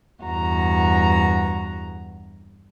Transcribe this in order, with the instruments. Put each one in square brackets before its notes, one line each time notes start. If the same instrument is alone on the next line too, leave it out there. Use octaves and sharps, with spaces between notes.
[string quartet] E2 G2 F#4 A#5